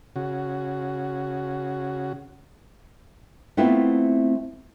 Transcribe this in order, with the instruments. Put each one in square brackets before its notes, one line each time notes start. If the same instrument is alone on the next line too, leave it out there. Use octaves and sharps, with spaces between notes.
[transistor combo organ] C#3 F#4
[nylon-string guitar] A3 B3 C4 E4 F4